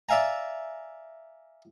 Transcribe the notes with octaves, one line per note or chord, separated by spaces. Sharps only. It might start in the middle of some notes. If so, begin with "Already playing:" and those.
D5 E5 F5 G#5 A#5